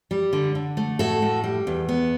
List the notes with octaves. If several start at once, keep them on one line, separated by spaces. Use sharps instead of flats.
G3
D3
D3
A3
A2 F#4 A4
A2
G3
E2
B3